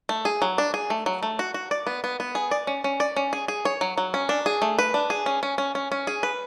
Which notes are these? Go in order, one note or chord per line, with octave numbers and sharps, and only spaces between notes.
A3
G#4
F#3
D4
G#4
A3
F#3
A3
F#4
F#4
D5
B3
B3
B3
G#4
D5
C#4
C#4
D5
C#4
G#4
G#4
C#5
F#3
F#3
C#4
D4
G#4
A3
B4
D4
G#4
C#4
C#4
C#4
C#4
C#4
G#4
B4